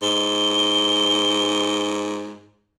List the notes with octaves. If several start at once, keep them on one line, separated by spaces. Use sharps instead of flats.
G#2 G7